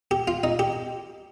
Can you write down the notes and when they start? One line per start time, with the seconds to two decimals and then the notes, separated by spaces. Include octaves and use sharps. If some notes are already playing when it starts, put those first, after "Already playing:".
0.11 G4
0.28 F4
0.44 D#4
0.59 G4